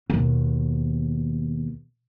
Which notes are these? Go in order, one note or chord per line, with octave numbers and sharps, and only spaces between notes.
D#2 B2